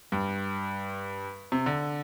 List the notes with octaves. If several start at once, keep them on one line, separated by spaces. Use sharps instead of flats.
G2
C3
D3